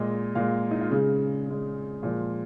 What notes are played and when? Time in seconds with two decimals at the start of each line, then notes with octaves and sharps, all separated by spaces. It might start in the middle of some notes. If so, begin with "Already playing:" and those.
Already playing: A#2 G#3 D#5
0.35 A#2 G#3 F5
0.71 D#4
0.81 F4
0.91 C#3 G#3 G#4
1.47 C#3 G#3
2.03 A#2 F3 G#3 F4